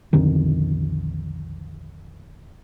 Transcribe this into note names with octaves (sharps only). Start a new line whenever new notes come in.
B1 F2 D3 D#3